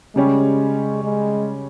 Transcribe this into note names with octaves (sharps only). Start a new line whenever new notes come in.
C#3 G3 G#3 C#4 G4
G#3